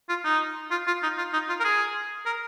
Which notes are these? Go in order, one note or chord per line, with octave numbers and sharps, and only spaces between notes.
F4
D#4
F4
F4
D#4
F4
D#4
F4
A#4
G#4
A#4